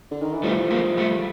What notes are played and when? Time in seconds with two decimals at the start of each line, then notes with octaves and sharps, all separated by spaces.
0.11 D3
0.22 D#3
0.32 E3
0.44 F3 G3 A3
0.71 G#3 A#3
0.97 G3 A3